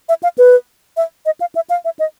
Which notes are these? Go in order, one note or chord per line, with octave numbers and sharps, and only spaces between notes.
E5
F5
B4
E5
D#5
F5
E5
F5
E5
D#5